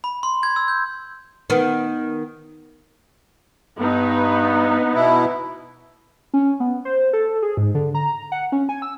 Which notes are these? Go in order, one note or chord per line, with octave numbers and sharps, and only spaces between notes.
B5
C6
G#6
E6
G6
D#3 B3
G2 B3 D#4
B2 E4
C#4
B3
C5
A4
G#4
G#2
D3
A#5
F#5
C#4
G#5
E6